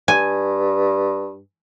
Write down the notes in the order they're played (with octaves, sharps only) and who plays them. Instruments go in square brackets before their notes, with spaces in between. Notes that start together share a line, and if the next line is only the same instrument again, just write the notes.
[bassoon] G2 [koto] G#5